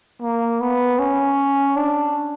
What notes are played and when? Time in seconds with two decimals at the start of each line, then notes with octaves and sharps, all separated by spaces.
0.22 A#3
0.61 B3
0.99 C#4
1.77 D4